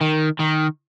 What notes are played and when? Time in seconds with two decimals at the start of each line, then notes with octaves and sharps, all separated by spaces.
0.01 D#3
0.39 D#3